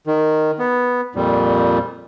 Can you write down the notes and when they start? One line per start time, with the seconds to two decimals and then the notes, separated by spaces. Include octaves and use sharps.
0.07 D#3
0.59 B3
1.15 F2 A#2 G3